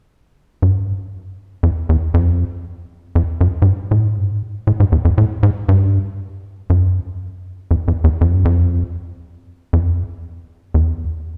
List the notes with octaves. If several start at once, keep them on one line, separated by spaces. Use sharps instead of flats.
G2
F2
E2
F2
F2
F#2
G#2
G2
A2
G#2
G2
G#2
A2
G#2
E2
F2
A2
G#2
G2
F#2
F2
F2
E2
F2
F#2
F2
F2
E2